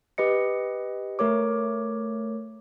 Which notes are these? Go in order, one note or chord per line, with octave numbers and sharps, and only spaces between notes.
G4 B4 D#5 C#7
A3 A#4 C#5 D6